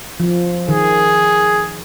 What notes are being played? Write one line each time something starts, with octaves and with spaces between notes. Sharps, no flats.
F3
D#3 G#4